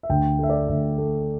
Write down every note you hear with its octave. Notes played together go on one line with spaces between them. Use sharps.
E5
D2 G5
A3 E5
D5
D2 E5
A3